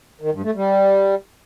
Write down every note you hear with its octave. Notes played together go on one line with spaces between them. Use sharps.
D#3
G2
A3
G3